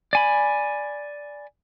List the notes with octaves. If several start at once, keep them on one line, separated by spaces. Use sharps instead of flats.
D5 G#5 B5